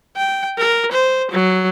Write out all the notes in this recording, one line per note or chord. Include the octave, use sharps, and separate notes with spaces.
G5
A#4
C5
F#3